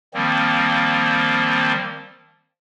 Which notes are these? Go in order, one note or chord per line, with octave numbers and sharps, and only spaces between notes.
D#3 F3 G3 A#3 C4